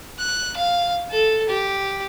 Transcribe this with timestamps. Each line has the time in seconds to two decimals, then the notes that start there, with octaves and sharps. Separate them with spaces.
0.19 F#6
0.57 F5
1.11 A4
1.49 G4